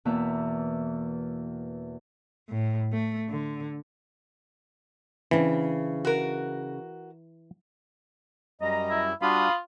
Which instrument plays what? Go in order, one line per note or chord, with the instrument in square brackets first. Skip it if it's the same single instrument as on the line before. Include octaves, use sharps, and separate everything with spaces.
[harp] E2 B2 E3 A#3 E5
[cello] A2
A3
D3
[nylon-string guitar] C#3 C4 D4 [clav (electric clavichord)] E3
[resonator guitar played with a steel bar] F#4 A#4
[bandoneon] F#2 G3 [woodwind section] D#5 A#5
[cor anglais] E4
[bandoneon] G3 D4 F#4 [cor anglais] F4 [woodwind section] F5 B5 D#6